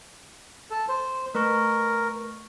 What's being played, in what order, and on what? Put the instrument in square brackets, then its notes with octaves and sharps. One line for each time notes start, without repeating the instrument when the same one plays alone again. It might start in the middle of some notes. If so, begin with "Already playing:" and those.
[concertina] A4
C5
[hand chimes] A3 B4 C#6 [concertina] A#4